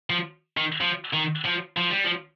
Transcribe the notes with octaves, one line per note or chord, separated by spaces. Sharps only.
F3
D#3
F3
D#3
F3
F3
G3
F3